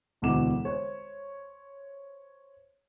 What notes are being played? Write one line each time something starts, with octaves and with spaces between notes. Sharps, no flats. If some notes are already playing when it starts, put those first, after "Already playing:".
E1 D2 B2 E4 D6 E7
C5 C#5